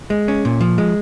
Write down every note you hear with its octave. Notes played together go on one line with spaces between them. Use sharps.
G#3
C#4
A#2
F3
G#3